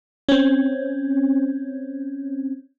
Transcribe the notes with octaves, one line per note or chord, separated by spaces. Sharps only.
C4 C#4